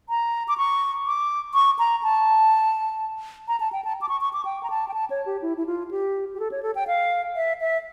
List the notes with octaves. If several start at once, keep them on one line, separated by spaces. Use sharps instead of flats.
A#5
D6
C#6
D6
C#6
A#5
A5
A#5
A5
G5
A5
D6
C#6
C#6
D6
G5
A#5
A5
G5
A5
C#5
G4
E4
E4
F4
G4
G4
A4
C#5
A4
G5
F5
E5
E5